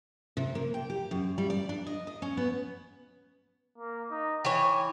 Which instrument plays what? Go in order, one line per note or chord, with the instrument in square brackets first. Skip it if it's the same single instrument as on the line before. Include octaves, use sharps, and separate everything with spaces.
[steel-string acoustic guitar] C3
A#3
G5
G4
F#2
G3
D5
D4
D#5
D#5
C#4
B3
[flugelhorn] A#3
D#4
[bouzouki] E3 C#5 [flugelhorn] G5